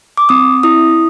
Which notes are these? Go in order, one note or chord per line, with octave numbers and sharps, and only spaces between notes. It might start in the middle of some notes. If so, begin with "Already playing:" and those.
D6
C4 D#6
E4 D#6